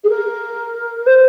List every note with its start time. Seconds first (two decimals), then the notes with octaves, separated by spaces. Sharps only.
0.03 G#4
0.09 A#4
1.06 C5